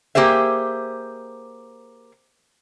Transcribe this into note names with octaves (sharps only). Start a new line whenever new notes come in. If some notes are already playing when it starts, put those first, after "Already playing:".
A#3 G4 G#4 C5 E5